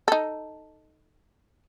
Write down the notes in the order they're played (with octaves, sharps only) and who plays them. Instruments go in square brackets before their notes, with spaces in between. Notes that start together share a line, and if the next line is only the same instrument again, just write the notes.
[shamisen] D#4 A4